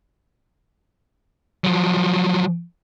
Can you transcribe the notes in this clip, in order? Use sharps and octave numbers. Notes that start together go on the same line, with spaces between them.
F3 F#3